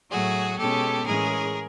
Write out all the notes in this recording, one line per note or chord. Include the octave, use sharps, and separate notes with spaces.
A2 F#3 A3 F#4 G#4
B2 G#3 C#4 G4 A4
A2 E3 G#3 C#4 G#4 A#4